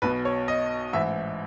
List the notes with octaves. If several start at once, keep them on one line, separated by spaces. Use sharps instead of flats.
B1 B2 B4
C#5
D#5
A1 G#2 E3 E5